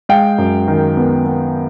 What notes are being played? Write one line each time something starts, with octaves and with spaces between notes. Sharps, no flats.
G#3 F5 G5
F#2
D#3
B3
B3